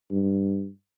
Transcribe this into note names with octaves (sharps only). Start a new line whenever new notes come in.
G2